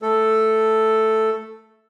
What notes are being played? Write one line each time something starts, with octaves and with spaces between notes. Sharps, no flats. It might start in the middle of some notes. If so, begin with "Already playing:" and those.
A3 A4